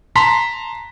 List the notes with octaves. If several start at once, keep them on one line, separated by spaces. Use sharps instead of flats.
A5 A#5 C6 B6